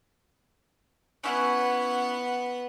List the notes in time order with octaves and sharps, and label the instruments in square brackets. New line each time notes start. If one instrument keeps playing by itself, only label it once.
[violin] B3 F#5 [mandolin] C#4 E4 F#6